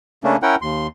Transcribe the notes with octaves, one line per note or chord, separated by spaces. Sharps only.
C#3 A3 A#3 C#4 D4
C#4 E4 A#4 F#5 G5
D#2 C6